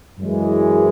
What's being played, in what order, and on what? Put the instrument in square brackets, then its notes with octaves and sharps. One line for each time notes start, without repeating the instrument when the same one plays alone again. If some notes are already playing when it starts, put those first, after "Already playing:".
[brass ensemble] F#2 E3 G#3